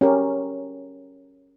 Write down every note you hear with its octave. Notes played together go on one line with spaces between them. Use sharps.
C#4 G4 A#4